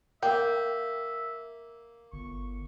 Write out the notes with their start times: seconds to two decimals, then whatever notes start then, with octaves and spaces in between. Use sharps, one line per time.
0.23 A#3 E5 G5
2.13 G1 C#6